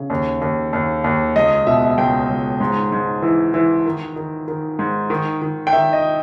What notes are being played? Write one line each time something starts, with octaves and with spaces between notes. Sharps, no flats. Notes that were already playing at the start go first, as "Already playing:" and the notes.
Already playing: C#3
D#2
D#2
D#2
D#2
C#2 D#5
B2 E5
E5
C#2 G5
C#2
G#2
G#2
E3
E3
D#3
D#3
D#3
G#2
D#3
D#3
G5
D#3 E5
D#5